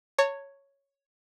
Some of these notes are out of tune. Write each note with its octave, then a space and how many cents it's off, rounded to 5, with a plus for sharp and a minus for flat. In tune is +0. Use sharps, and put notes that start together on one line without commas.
C#5 +0 A5 +45